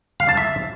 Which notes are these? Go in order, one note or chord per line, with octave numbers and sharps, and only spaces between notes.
F5
A5
E5